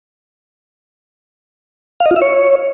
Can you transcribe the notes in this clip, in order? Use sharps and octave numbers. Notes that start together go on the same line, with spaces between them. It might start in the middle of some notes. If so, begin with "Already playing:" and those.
F5
D#5
F4
E5
C#5